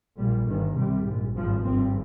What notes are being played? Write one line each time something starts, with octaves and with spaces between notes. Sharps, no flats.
A#1 A#2 G3
G1 G2 D#3
C2 C3 G3
A#1 G#2
G#1 G2 F3
G#1 G2 C4